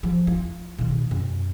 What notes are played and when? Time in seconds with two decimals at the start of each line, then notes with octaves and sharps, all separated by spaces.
0.03 F3
0.27 F4
0.78 B2 D#3
1.11 F#2